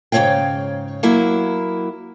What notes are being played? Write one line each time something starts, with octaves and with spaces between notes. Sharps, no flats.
G#2 C#3 A#3 C#5 F5 G5
F#3 A#3 E4